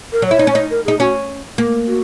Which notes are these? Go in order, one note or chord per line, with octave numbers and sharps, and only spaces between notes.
A#4
F#3
E4 C#5
D#4
C#4
D#4
A#4
D#4 G#4
C#4 F#4
A#3
F#4